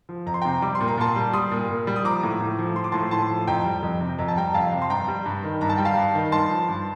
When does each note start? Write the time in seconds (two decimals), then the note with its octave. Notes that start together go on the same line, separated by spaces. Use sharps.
0.09 F3
0.26 F2 A#5
0.34 C6
0.42 C3 G5 A#5
0.62 G3 D6
0.75 C6
0.80 A#2
0.88 A#5
0.97 A#2 A5 C6
1.16 G3
1.33 G3 C6 D#6
1.51 A#2
1.69 A#2
1.87 G3
1.96 D#6
2.04 F3 A#5 D6
2.23 A2
2.40 A2
2.58 F3
2.76 F3 C6
2.84 D6
2.92 A2 A5 C6
3.11 A2 A5 C6
3.30 F3
3.47 F2 G5 A#5
3.65 G3
3.83 F2
4.01 C3
4.18 F2 A#5
4.28 A5
4.37 G3 G5 A#5
4.54 F2 F5 A5
4.72 C3
4.82 C6
4.90 G2 G5 A#5
5.08 G3
5.25 G2
5.44 D#3
5.61 G2 A#5
5.70 A5
5.78 G3 G5
5.85 F5 A5
5.97 G2
6.15 D#3
6.32 G2 A5 C6
6.50 F3
6.68 G2